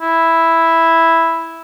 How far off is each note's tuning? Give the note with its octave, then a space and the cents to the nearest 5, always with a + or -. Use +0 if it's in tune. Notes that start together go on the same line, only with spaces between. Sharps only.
E4 +0